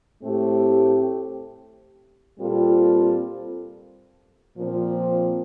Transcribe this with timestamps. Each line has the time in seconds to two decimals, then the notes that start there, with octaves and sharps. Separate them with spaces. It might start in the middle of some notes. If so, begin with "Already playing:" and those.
0.21 A2 A3 C4 G4
2.39 A#2 G3 C4 F4 A4
4.56 A#2 F3 C4